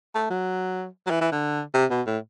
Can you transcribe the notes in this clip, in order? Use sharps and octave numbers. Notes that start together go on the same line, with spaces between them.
A3
F#3
F#3
E3
E3
D3
C3
B2
A2